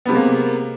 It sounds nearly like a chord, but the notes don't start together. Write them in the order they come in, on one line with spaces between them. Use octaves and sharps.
B3 C3 G#3 A#3